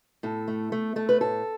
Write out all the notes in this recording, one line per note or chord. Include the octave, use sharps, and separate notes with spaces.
A2 A4
A3
A3
A3 A4
B4
A2 A4